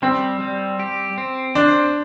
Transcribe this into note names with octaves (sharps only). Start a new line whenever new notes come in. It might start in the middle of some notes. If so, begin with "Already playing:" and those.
G3 C4
G3
G4
C4
D4 C5